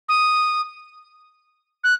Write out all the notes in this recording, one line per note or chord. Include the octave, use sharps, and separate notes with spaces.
D#6
F#6